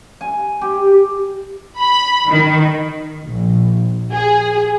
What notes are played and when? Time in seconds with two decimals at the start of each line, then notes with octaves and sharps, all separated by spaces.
0.21 G#5
0.61 G4
1.79 B5
2.29 D#3
3.23 A#1
4.11 G#4